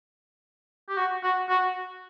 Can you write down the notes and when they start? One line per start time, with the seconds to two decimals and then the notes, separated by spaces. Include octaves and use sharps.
0.89 G4
0.97 F#4
1.23 F#4
1.49 F#4